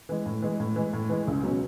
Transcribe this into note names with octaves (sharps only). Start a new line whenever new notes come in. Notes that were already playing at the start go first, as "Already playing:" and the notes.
E3 G#3
A2
E3 G#3
A2
E3 G#3
A2
E3 G#3
C#2
B2 F#3 C#4